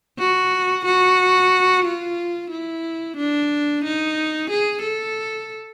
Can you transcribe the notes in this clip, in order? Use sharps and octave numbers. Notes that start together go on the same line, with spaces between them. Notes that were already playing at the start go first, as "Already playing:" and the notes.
F#4
F#4
F4
E4
D4
D#4
G#4
A4